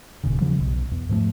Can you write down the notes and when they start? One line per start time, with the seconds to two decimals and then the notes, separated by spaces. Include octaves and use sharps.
0.23 E1 D#2 A#2 C#3
0.40 E2 C#3 F3 G3
0.60 B1 B2
0.91 E2
1.09 G#2 F3 G#3 A3